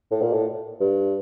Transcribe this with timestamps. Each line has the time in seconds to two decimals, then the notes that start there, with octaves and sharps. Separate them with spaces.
0.11 A2
0.21 A#2
0.33 A2
0.80 G2